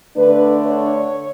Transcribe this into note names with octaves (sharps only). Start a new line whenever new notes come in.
D3 A3 D4 B4
C#5